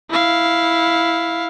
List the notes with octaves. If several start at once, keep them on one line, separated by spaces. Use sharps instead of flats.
E4 F5